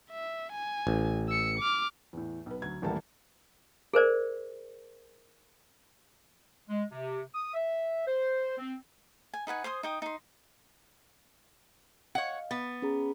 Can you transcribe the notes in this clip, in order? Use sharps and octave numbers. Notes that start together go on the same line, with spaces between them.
E5
G#5
A1
E6 C#7
D6 F6
E2 A2
B1 B4
D2 F#3 G#6
D#1 A1 G3 A3 A#3 A5
G#4 A#4 C5 D5
G#3
C3
D#6
E5
C5
C4
G#5
D#4 B4 F#5 G#5
C5 G#5 C6 D#6
D#4 G5 D#6
D#4 C6
C#5 D#5 F5 F#5
B3 A6
C#4 G#4 A#5